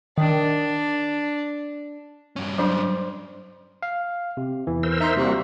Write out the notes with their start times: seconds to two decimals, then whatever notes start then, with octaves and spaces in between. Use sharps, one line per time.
0.18 D#3 D4
2.36 G2 C#4
2.58 F#3 D4 C5 D5 C#7
3.83 F5
4.37 C3
4.67 E2 E3
4.83 A#4 C5 E6
5.00 D#4 E5 C6
5.17 C3 G3 A#3 F#4